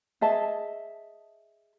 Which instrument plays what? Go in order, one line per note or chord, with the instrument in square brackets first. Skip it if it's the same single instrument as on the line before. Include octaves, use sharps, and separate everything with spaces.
[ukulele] G#4 D#5 E5 A5